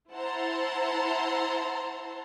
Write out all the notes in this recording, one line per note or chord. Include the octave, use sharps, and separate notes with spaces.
E4 C5 F#5 A5 A#5 C6